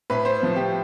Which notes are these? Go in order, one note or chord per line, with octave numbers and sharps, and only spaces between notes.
A2 B4
C5
F3 B3
G4